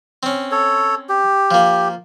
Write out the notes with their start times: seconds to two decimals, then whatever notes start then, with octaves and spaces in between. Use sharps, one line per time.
0.23 C4 C#4
0.52 A4 C#5
1.09 G4
1.51 F3 A#3